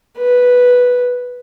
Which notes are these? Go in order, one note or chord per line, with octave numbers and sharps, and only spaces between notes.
B4